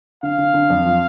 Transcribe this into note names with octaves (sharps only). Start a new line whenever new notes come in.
D3 F5
D3
D3
F2
F3